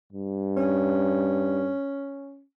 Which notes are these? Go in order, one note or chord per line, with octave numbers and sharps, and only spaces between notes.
G2
C#4